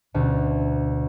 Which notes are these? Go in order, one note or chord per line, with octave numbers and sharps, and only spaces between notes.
D2 B2 D3